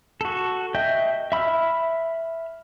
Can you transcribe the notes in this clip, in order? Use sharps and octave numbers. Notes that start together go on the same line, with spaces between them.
F#4 A4
D#5 E5 G5 G6
E5 B5 E6 F6